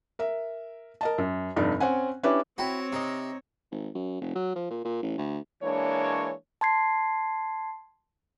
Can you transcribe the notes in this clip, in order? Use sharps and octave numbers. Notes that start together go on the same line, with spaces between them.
A#4 E5
A#4 D#5 A5
F#2
F1 G2 D#4 D5
C4 C#4 F#5 G#5
C#4 D4 E4 G4 B4
C4 E4 F#4 C#5 G5 B5
C3 D#4 D#5
G#1
F#2
F1
F#3
F3
A#2
A#2
A1
D2
E3 G#3 A#3 D4 C#5
A5 C6 G#6 C7